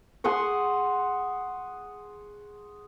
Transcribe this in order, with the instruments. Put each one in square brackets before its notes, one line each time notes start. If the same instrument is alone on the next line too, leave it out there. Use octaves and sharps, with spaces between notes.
[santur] G#4 F#5 C6 C#6